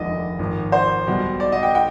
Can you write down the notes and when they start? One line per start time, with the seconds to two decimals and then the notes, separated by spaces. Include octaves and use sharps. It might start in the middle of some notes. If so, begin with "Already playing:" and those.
Already playing: F1 D#2 D3 F3 G#3 D5 D#5
0.39 G#1 G#2 F3
0.72 C5
1.07 B1 B2 G3
1.40 D5
1.52 D#5
1.63 G5
1.75 G5